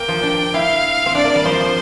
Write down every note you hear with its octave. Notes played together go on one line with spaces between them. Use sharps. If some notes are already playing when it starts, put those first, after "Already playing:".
Already playing: A#3 G5
F3
D4
E4 F5
C4
D4 D5
A#3
G3
F3 C5
F3